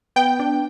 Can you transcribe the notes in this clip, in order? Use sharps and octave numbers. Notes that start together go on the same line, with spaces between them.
B3 G5
D4